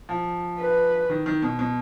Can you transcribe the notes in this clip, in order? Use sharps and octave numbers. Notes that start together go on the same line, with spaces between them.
F3
B4
D#3
D#3
B2
B2